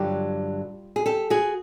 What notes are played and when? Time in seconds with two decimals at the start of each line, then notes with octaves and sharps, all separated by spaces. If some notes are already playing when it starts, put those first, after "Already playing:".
Already playing: G2 D3 F#3 F4 G4
0.96 G#4
1.06 G4 A4
1.30 F#4 G#4